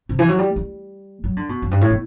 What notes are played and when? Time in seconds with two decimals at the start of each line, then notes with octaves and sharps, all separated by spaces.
0.09 C3
0.19 E3
0.28 F#3
0.38 G3
0.56 G3
1.24 F#3
1.36 D3
1.49 B2
1.62 F#2
1.71 G2
1.81 A2
1.90 B2